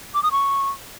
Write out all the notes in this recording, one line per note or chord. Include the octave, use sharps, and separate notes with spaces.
D6
D#6
C#6